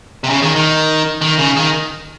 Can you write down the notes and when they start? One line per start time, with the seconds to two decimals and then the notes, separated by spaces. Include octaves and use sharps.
0.24 C3
0.30 C#3
0.42 D#3
0.56 D#3
1.21 D#3
1.39 C#3
1.56 D#3